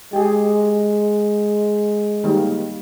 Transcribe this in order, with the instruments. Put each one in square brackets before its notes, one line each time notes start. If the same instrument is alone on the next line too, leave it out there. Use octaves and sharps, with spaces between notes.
[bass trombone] G#3 [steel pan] G4 G#4
[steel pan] D#3 G3 A#3